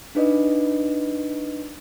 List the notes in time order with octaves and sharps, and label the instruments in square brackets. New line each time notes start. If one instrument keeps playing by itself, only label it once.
[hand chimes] D4 D#4 F4 B4 D5 D#5